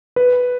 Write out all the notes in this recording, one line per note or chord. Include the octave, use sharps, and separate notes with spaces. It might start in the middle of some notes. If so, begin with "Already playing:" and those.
B4